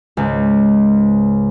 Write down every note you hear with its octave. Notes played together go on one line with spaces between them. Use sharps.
C#2 G#2